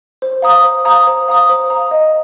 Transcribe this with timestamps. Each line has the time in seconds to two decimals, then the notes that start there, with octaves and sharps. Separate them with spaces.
0.22 C5
0.42 F5 A#5 D#6
0.64 C5
0.85 F5 A#5 D#6
1.07 C5
1.28 F5 A#5 D#6
1.49 C5
1.70 F5 A#5 D#6
1.91 D#5